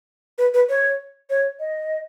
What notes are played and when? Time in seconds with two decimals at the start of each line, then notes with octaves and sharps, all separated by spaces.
0.38 B4
0.54 B4
0.69 C#5
1.30 C#5
1.60 D#5